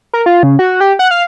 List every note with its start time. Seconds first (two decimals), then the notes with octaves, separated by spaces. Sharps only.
0.13 A#4
0.26 F4
0.43 C#3
0.59 F#4
0.80 G4
0.99 F#5
1.11 F5